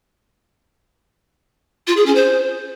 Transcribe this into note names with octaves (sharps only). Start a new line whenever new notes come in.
F4
G#4
C#4
C5